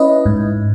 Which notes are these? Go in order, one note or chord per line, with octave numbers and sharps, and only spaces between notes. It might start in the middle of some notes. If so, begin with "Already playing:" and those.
Already playing: C#4 E4 B4 D#5
G#2